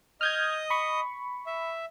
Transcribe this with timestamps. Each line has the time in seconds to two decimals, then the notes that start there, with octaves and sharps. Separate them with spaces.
0.21 D#5 D#6 F6 G6 G#6
0.70 B5 C#6
1.46 E5